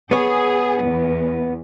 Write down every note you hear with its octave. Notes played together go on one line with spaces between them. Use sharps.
B3 G#4 C#5
E2